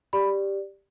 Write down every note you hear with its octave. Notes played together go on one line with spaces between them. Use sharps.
G4 D5 B5